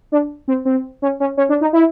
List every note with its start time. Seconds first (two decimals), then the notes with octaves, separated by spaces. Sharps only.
0.12 D4
0.48 C4
0.65 C4
1.02 C#4
1.20 C#4
1.37 C#4
1.49 D4
1.61 D#4
1.73 E4